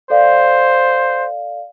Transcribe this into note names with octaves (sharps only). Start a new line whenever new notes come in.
A4 C5 D5 F5